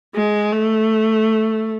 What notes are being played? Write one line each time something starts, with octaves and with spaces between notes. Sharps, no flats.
G#3
A3